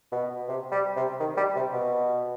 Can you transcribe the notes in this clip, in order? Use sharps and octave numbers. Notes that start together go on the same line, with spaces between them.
B2
C3
G3
C3
D#3
G3
C3
B2